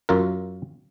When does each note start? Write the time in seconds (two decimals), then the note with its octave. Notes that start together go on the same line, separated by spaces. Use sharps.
0.09 F#2 F4 A#4